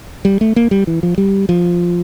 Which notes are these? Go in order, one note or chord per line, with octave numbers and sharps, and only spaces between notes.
G3
A3
A#3
G3
E3
F3
G3
F3